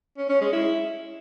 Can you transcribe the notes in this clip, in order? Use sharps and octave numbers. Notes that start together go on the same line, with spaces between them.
C#4
C#4
G#3
E4